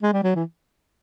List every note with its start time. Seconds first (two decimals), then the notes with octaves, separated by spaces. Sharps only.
0.03 G#3
0.13 G3
0.23 F#3
0.35 E3